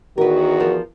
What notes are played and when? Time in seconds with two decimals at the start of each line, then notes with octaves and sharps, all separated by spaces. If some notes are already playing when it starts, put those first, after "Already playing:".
0.18 E2 D#3 F#4 A#4 B4
0.60 F3 A#4